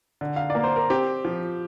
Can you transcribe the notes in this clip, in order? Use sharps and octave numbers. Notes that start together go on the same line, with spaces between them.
D3
F5
D5
A#3
C5
A#4
C4 G4
F3